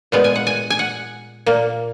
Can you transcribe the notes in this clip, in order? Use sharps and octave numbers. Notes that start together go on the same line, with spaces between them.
A#2 G#3 B3
G#5
F#5
G#5
G#5
F#5
A#2 A#3